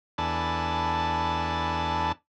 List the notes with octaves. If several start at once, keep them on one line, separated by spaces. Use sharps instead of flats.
E2 D4 A4 G#5 A5 B5